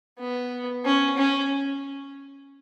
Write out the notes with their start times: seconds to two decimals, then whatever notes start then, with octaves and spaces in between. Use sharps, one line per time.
0.19 B3
0.85 C#4
1.18 C#4